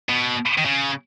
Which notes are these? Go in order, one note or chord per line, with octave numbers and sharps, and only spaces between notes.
B2
D#3
C#3